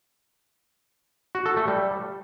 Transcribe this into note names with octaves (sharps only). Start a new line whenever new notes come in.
F#4
A4
A3
G3